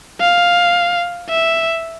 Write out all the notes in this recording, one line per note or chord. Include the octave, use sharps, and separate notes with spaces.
F5
E5